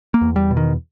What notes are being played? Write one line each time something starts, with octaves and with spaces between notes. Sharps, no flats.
A#3
E2
G3
B2
D#3